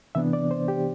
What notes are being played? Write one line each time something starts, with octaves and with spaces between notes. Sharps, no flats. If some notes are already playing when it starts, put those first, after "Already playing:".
C3 E3 B3 D4 E5
D5
C5
G4